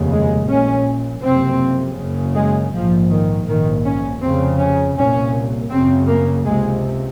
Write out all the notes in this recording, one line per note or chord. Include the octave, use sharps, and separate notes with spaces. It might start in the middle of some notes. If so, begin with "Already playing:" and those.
Already playing: F1 D#2 C#3
G#3
A#1 A#2 C#4
F#1 F2 C3 C4
F#1 F#2 C#3
G#3
A#1 G#2 F3
D#3
A#1 G#2 D#3
C#4
F1 F2 C#3 C4
C#4
C2 A#2 C#4
F#1 F#2 C#3 C4
A#3
C#2 C3 G#3